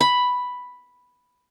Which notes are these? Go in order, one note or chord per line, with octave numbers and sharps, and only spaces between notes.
B5